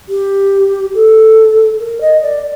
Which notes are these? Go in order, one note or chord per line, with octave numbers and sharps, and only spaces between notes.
G4
A4
A#4
D#5
D5